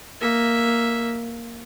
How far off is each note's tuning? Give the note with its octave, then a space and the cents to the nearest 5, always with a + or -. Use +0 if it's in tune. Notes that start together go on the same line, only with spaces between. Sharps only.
A#3 +0 E5 +0